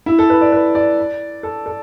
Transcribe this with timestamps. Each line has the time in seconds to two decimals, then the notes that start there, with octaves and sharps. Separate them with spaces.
0.06 E4
0.19 A4
0.30 B4
0.41 D5
0.52 B4
0.75 D5
1.43 A4
1.66 A4